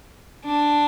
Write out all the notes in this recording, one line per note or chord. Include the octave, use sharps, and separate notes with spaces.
D4